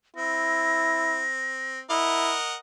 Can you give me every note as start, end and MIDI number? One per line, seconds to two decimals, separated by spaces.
0.16 1.84 60
0.16 1.26 64
0.16 1.80 94
1.90 2.35 64
1.90 2.55 70
1.90 2.55 75
1.90 2.55 78